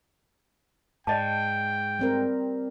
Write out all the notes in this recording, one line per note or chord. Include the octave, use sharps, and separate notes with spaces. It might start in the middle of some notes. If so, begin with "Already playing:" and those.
G#2 D5 D#5 G5 A5
G3 C4 A#4